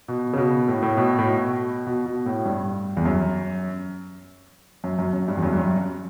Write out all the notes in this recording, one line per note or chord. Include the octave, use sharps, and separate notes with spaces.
B2
C#3
B2
A2
A2
B2
A2
B2
B2
B2
A2
G2
E2
F#2
F#2
F#2
F#2
G2
E2
F#2
G2
F#2